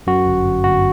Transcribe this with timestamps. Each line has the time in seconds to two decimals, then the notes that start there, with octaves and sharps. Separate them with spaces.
0.07 F#2 F#4
0.26 G1
0.45 G1
0.64 G1 F#4